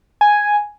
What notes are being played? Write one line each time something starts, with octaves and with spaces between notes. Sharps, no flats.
G#5